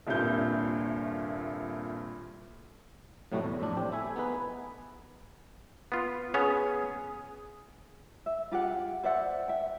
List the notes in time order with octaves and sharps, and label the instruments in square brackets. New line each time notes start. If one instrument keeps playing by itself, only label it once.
[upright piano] D#1 C2 G2 A#2 G6
[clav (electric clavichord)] A2 C3 F#3 G3 A3 F#4
E2
F2 A2 D4
C4 G4
A3 E4 E5 G#5
B3 D#4 G#4 B4
B3 F4
[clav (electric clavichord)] B3 C#4 C#5 [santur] G#4
[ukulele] E5
F4 G4 G#4 F#5
C5 D5 E5 F#5
E5 G5